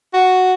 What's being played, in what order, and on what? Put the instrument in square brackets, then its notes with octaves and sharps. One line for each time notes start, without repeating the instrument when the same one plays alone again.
[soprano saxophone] F#4